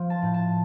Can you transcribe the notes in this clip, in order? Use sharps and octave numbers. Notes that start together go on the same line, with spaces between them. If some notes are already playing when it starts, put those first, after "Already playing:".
Already playing: F3
A5
A2
A5